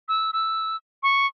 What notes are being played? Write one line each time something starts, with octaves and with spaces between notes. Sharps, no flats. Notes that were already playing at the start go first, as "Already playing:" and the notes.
E6
E6
C#6